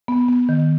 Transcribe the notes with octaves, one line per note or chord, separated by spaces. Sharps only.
B3
B3
D#3